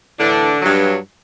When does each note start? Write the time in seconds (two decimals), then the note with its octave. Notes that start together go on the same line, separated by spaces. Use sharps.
0.19 A2 D3 E3 D4
0.62 G2 F#3